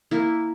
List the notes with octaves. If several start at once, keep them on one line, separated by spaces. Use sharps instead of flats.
A#3 E4